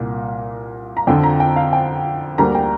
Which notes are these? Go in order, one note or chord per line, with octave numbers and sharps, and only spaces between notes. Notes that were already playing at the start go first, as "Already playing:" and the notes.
Already playing: C2 A#2 A#3
A#5
F2 D3 F3 C4 G5
A#5
G5
F5
G5
D2 D3 G3 A#3 A#5
G5